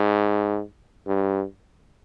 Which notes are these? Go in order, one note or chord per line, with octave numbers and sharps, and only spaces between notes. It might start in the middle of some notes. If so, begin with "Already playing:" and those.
Already playing: G#2
G2